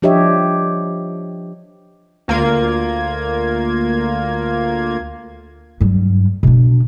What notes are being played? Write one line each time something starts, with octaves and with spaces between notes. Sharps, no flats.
F3 D4 G4 C#5 D#5 E5
D2 A#3 F4 G#6
G2 F#3
B2 D4